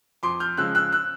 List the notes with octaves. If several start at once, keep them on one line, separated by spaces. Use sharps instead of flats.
F2 C6 D6
F6 G6
C#3 F3 G#3 E6 F#6
E6 F#6
E6 F#6